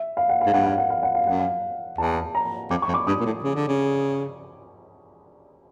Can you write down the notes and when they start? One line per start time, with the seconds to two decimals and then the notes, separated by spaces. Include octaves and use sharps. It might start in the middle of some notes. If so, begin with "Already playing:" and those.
Already playing: E5
0.17 F5
0.29 F#5
0.41 F5
0.46 G#2
0.53 G2 F#5
0.66 F5
0.78 F#5
0.90 F5
1.03 F#5
1.15 F5
1.26 F#2 F#5
1.39 F5
1.98 E2 A5
2.35 A#5
2.70 F2 D6
2.82 C#6
2.88 F2
2.94 D6
3.07 G2 D#6
3.20 A#2
3.26 A2
3.44 C#3
3.55 D3
3.68 C#3